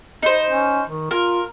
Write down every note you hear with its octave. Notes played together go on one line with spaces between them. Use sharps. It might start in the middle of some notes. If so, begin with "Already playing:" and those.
D#4 C5
C#4
D#3
F4 A#4